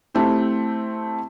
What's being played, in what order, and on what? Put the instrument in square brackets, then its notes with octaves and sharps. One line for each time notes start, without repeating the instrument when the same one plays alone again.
[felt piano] A3 C4 E4 G4